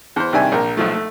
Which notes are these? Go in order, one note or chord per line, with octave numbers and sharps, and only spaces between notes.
E2 C5
C2 C3 D#3 D4 E5 G#5
A#1 A#4
B1 F3 A3
A3